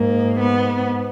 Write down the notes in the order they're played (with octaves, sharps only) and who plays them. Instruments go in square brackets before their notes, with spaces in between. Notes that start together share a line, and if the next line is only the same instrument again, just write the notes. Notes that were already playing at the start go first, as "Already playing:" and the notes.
Already playing: [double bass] G#2 [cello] A#3
[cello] B3